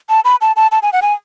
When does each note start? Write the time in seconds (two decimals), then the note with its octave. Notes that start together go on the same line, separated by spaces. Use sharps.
0.09 A5
0.25 B5
0.41 A5
0.56 A5
0.72 A5
0.83 G#5
0.93 F#5
1.02 G#5